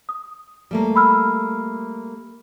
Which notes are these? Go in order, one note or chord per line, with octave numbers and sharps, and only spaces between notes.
D#6
G3 A3 A#3
B5 E6 F6